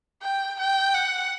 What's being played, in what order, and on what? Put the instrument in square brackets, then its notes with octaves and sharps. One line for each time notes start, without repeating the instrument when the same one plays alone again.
[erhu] G5
G5
F#5